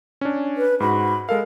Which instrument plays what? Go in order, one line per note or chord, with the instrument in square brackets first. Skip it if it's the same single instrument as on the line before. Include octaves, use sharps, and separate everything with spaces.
[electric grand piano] C#4 D4
[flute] B4
[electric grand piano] G#2 F#4 [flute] B5
[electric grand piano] G#3 A4 F5 [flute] A#4